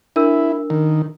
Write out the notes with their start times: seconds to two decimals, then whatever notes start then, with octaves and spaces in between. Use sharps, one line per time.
0.16 D4 E4 A#4 E6
0.70 D#3